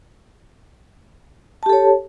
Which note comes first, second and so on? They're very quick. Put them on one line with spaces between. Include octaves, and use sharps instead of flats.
A5 G4 A4 C#5